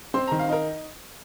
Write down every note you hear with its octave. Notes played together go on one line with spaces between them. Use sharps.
C4 C6
D#3 A#5
F5
D#4 A#4